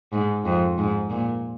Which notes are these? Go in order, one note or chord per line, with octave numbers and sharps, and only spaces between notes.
G#2
F2
G#2
A#2